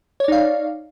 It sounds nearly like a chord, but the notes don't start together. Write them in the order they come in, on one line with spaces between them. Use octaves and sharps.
C#5 D5 D#4 F5